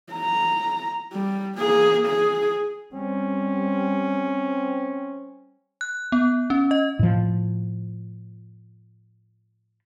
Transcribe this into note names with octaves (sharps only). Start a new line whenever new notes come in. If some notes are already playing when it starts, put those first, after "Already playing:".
A#5
G3
A#3 G#4
G#4
G3 C4 C#4
F#6
B3
C#4
D#5
A2 F3